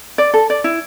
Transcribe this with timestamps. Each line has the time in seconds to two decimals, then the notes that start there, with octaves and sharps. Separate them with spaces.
0.18 D5
0.34 A4
0.50 D5
0.64 E4